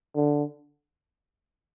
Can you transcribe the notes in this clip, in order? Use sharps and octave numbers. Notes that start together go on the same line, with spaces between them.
D3